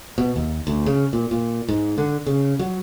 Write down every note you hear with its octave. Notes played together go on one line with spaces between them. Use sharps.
B2
D#2
D2
C#3
A#2
A#2
G#2
D3
C#3
F#3